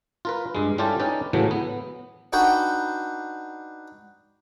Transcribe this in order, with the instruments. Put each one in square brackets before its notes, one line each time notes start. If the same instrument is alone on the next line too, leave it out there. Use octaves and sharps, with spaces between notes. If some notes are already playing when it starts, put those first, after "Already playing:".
[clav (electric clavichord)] F4 A#4 B4
G2 G#3
G3 C#4 E4 F4 G4 A4
C#4 D#4 B4 D5 G5
A2 C#3 E3 F#3 A3
B3
[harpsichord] D4 D#4 F#4 B4 F#5 G5